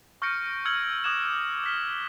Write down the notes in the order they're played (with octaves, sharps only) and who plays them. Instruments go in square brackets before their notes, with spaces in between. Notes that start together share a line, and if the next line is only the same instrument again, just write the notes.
[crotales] C#6 F6 G6 A#6 C#7 D7
E6 F6 G#6 C#7 F#7
D6 D#6 F#6 G#6 E7
F6 B6 G7